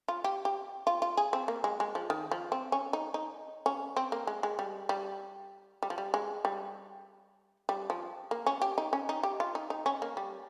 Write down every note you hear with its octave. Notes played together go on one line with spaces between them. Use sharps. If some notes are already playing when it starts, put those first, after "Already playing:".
F4
G4
G4
F4
F4
G#4
C4
A#3
G#3
G#3
F3
D#3
F3
C4
C#4
D#4
D#4
C#4
C4
A#3
G#3
G#3
G3
G3
G3
F3
G3
G#3
G3
G3
F3
A#3
C#4
G4
D#4
C#4
D#4
G4
F4
D#4
D#4
C#4
A#3
G3